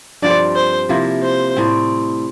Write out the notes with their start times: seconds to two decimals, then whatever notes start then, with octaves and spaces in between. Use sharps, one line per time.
0.22 G2 F3 C4 D5
0.55 C5
0.89 C3 F3 A#3 E4
1.23 C5
1.56 A2 G3 C4